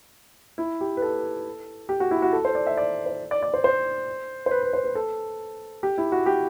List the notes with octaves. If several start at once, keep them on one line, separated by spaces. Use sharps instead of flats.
E4
G4
B4
A4
G4
F#4
E4
F#4
A4
C5
D5
E5
D5
C5
D5
D5
C5
C5
C5
B4
B4
C5
B4
A4
G4
E4
F#4
G4